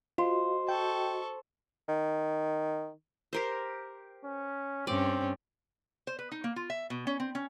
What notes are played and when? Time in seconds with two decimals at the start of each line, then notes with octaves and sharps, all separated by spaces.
0.18 F4 F#4 C5 D#5
0.69 A4 G5 C#6
1.89 D#3
3.33 G4 A#4 C5
4.25 C#4
4.87 G2 C4 C#4 D5
6.07 C5
6.19 B4
6.32 D#4
6.44 A#3
6.56 F4
6.70 E5
6.90 B2
7.07 C#4
7.20 C4
7.35 C#4